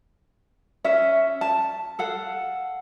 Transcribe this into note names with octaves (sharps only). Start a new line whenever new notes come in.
C#4 E5
A5
A4 F5 F#5